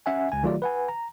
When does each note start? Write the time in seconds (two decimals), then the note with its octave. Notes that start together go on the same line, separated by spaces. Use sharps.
0.06 C#4 E5 F#5 G#5
0.32 C#2 G#5
0.43 D#3 F#3 A3 F4 G4 D5
0.62 B4 F#5 G#5
0.89 A#5